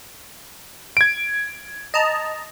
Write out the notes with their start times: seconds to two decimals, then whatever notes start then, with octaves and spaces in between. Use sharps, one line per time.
0.97 G#6 D7
1.94 D#5 A5 A#5